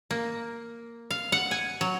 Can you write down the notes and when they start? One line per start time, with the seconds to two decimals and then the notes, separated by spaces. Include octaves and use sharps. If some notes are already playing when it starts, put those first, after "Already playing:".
0.11 A#3
1.11 F5
1.32 F#5
1.51 G#5
1.81 F#3